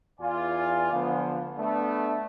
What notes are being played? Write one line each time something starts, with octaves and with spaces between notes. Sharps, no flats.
E2 F4 D5 G#5
D3 F3 A3 B3
A3 B3 D4